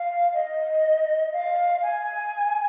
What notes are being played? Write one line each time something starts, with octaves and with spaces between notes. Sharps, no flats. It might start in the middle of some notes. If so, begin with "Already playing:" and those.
Already playing: F5
D#5
F5
G#5